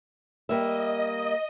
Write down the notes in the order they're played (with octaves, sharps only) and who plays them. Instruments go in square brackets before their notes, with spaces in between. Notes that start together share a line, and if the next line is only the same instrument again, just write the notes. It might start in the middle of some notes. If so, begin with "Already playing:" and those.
[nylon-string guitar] G3 A#3 E5 [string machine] D#5